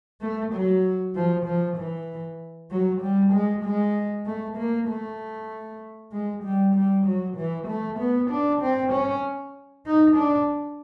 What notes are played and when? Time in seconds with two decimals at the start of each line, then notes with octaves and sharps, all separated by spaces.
0.21 A3
0.53 F#3
1.15 F3
1.45 F3
1.77 E3
2.70 F#3
3.01 G3
3.33 G#3
3.64 G#3
4.25 A3
4.57 A#3
4.88 A3
6.12 G#3
6.43 G3
6.75 G3
7.06 F#3
7.37 E3
7.68 A3
7.99 B3
8.30 D4
8.61 C4
8.92 C#4
9.86 D#4
10.16 D4